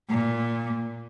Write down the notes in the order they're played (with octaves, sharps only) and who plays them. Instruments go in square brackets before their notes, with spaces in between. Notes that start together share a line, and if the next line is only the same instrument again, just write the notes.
[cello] A#2